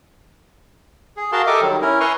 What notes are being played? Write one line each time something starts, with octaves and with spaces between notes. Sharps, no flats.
G#4
F#4 G#4 A#4 F5 A5 C6
G4 A4 A#4 D#5 E5 D6
D#3 F#3 G3
C#4 E4 A#4
B4 E5 G#5 A#5 C6 C#6